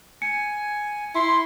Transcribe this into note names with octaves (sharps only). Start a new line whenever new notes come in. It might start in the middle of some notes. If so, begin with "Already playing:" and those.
G#5 C#7
E4 C6